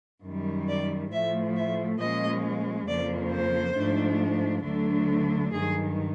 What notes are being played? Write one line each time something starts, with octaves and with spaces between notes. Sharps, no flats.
F#2 D#3 G3
D5
A2 F3 A3 E5
E5
A#2 F3 G#3 C#4 D#5
F2 C#3 F3 A#3 D5
C5
G#2 F3 A3 D4
D2 D3 F#3 A3 D4
G2 D#3 F#3 G#4